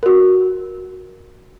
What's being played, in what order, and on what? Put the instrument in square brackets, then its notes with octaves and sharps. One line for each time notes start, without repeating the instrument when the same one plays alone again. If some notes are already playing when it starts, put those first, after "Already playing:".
[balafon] F#4 A#4